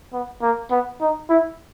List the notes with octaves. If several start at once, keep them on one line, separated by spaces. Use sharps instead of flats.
B3
A#3
B3
D#4
E4